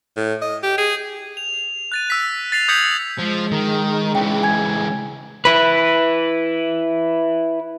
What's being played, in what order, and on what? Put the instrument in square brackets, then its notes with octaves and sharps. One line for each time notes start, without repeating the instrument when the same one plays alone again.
[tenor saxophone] A2
D#5
G4
G#4
[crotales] F7
F#6 A6 D#7
E6 B6
A6 C7 F7
D#6 G6 G#6 B6 C#7 F#7
[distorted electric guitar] F3 [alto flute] G#3
[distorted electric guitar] D#3
[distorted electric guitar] C#3 E3 [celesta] G5
[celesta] G#5 G#6
[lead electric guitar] E4 B4